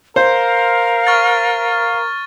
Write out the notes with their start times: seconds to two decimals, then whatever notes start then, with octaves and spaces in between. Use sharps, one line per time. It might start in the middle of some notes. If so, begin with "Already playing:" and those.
0.16 A#4 C5 F5
1.07 C#6 F6 A6